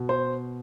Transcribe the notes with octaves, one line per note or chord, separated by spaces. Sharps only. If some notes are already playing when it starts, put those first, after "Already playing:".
Already playing: B2
C5